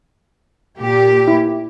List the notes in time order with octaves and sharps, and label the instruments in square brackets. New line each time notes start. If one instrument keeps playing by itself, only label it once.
[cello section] A#2 G4
[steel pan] E4